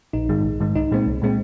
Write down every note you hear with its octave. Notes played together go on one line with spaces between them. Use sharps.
A#1 D#4
G#2 D#3 G#3
A#1
G#2 D#3 G#3
C2 D#4
A#2 G#3 C4
C2
A#2 G#3 C4